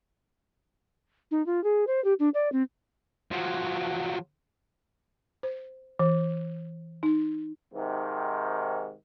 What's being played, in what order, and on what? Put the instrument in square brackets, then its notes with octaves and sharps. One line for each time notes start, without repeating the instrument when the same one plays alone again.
[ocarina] D#4
F4
G#4
C5
G4
D4
D5
C4
[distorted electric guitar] F3 F#3
[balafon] C5
E3
D#4
[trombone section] G#2 C3 D#3